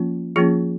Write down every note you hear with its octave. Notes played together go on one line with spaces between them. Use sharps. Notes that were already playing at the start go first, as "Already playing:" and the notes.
Already playing: F3 A#3 C#4 F4
F3 A#3 C#4 F4 G#4